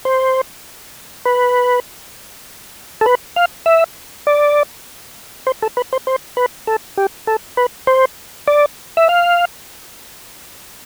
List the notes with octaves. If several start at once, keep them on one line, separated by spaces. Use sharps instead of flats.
C5
B4
A4
B4
F5
E5
D5
C5
A4
B4
C5
C5
B4
A4
G4
A4
B4
C5
D5
E5
F5